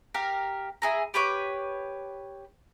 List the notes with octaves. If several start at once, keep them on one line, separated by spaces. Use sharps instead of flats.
G4 A#4 F5
E4 G#4 A#5
G4 B4 C#5 D6